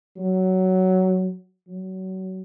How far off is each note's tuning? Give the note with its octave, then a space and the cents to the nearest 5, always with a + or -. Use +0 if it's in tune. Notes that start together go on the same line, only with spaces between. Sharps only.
F#3 +10
F#3 +25